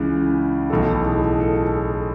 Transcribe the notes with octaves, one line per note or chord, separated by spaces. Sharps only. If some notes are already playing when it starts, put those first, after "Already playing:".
Already playing: C#2 C#3 E3
B1 A2 E3 A3 A4
G#4
A4
G#4
A4